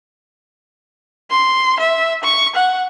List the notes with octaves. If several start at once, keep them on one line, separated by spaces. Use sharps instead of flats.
C6
E5
C#6
F#5